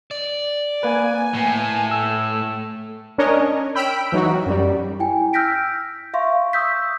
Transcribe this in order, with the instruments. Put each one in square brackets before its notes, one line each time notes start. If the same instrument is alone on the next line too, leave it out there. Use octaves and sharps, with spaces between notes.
[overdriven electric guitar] D5
[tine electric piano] A#3 B4 [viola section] G#5
[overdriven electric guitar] A2
[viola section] A3 [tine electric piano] E6
[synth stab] C#4 D4 A#4 C#5 D#5
G5 B5 E6 F6 B6 D7
E3 F#3 D#4 F#4
F#2 G3
[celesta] E4 G5 G#5
E6 F6 G6 A#6 B6 D7
E5 F5 C6 C#6
C#6 D#6 E6 G6 B6